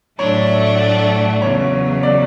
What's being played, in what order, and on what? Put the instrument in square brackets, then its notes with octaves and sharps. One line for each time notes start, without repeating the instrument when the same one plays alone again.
[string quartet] A2 F#3 A3 D4 A4 [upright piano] C#5
[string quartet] E2 C#3 F#3 [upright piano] C#5
[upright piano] D5